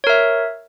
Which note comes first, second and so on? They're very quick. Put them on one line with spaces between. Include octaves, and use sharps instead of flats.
C#5 A#4 E5